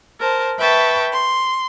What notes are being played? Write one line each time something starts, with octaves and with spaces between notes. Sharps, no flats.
A#4 C5 A5
B4 E5 G5 A5 C#6
C6